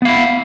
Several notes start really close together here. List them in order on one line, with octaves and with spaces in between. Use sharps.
B3 F5 E4